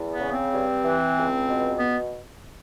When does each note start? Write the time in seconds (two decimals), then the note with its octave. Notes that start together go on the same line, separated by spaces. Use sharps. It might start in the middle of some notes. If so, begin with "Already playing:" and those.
Already playing: E2
0.09 B3
0.20 C#3
0.31 C4
0.52 G2
0.84 E3
1.16 C#2
1.47 B2
1.79 B3